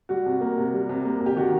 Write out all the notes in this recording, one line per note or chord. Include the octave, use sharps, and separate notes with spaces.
G3 F#4
C3
A#3
C3
G3
C3
A#3
C3
G4
D#3 F#4